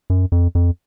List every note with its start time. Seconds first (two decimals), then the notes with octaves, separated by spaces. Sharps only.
0.10 F#2
0.32 F2
0.55 F2